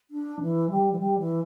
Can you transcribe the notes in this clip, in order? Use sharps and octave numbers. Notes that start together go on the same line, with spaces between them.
D4
E3
G3
E3
G3
E3